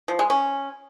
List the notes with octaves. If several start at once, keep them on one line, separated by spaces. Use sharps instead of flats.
F3
G#3
C#4